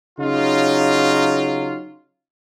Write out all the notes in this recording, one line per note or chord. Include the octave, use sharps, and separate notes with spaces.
C#3 F#3 D#4 F4